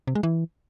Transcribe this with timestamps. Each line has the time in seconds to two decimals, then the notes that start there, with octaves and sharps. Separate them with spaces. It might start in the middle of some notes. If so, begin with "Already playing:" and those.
0.07 C3
0.15 G#3
0.23 E3